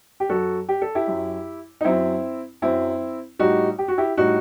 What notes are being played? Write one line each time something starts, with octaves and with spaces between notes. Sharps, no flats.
G4
F#2 F#3 F#4 A4
G4
A4
E4 G4
F#2 F#3
D#4
F#2 F#3 C4 E4
F#2 F#3 C4 E4
A2 G3 D#4 F#4
G4
F#4
E4 G4
A2 G3 D#4 F#4